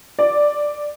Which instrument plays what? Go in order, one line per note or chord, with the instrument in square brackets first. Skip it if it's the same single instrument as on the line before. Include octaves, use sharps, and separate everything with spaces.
[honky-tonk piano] D5